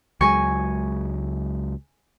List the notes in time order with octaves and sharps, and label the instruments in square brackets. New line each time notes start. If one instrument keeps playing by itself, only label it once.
[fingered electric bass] C#2 F#3 G#3 [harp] G#5 C#6